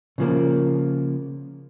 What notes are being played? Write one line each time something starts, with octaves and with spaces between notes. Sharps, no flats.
C#3 F3 A#3